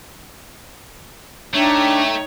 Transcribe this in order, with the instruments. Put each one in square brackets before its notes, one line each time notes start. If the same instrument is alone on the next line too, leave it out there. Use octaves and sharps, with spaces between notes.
[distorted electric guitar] A3 [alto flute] D4 [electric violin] D#4 C#5 [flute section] E5 G5 A#5